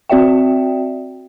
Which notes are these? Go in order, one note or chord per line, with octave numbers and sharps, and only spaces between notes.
C4 F#4 D5 E5 G5